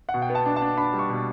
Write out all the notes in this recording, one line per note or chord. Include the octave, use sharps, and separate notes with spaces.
F#5
B2
G5
B3
A5
D4
A5
D4
D4 B5
G3
C#6
B2